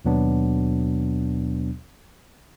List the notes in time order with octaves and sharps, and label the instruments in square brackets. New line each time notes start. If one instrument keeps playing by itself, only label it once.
[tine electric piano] D#2 B2 F#3 B3 D4